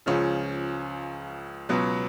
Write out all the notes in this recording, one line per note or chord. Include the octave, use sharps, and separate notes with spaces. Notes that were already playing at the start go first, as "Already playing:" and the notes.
C#2 C#3 F3 C#4
C#2 B2 F#3 B3